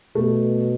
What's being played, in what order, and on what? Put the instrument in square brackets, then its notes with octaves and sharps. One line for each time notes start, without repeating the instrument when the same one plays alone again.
[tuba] B2 [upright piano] A3